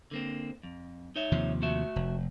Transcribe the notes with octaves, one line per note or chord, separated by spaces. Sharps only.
D3 A#3 C4
F2
D#4 C#5 E5
D#2 C3 F3
A3 F#4 E5
F1